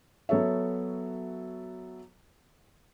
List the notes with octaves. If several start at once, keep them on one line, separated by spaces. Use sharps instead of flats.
F#3 B3 A4 C#5 E5